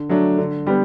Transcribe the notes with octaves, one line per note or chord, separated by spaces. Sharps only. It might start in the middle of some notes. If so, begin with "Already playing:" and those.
Already playing: D3
F#3 A3 D4
D3
G3 B3 G4